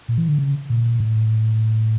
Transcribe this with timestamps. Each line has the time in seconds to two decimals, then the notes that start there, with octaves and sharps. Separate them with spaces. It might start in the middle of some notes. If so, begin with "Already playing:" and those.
0.09 A#2
0.18 E3
0.28 D3
0.38 C#3
0.70 A#2
1.00 A2